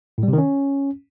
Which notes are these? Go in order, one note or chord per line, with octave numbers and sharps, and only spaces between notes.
A2
G3
C3
D#3
C#4